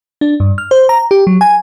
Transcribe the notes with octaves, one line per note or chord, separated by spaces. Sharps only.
D4
G2
F6
C5
A#5
G4
F#3
G#5